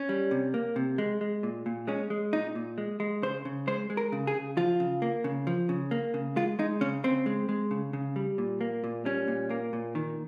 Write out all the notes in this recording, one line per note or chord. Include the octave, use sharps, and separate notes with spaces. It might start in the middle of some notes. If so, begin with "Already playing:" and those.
Already playing: C#4
G3
C3
A#3
C3
G#3
G#3
A#2
A#2
G#3 C#4
G#3
A#2 D#4
A#2
G#3
G#3
C#3 C5
C#3
G#3 C5
G#3
A#4
C#3
G#4
C#3
F3 F4
C#3
A#3
C#3
F3
C#3
A#3
C#3
G#3 F4
G#3 D#4
C#3 C#4
C#3 C4
G#3
G#3
C#3
C#3
G3
A#2
A#3
A#2
G3 C#4
A#2
A#3
A#2
D#3